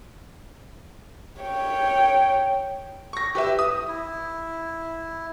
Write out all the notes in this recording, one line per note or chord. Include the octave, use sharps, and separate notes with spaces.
C#5 G5
C#6 A#6
G4 B4 E5
D#6
E4